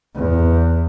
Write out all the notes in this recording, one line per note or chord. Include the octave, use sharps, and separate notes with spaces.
E2